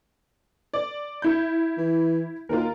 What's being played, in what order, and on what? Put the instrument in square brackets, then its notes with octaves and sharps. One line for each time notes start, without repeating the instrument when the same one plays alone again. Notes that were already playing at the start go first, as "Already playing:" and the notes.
[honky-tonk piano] D5
E4 G6
[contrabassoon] E3
[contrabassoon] D#2 [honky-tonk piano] F4 A#4